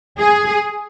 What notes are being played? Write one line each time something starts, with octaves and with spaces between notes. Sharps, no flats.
G#4